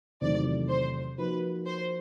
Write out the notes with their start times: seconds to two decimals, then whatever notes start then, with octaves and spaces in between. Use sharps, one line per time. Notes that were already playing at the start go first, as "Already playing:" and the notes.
0.21 E2 C3 D#3 F#3 A3 D5
0.69 C5
1.18 F3 A#3 D#4 F#4 B4
1.66 C5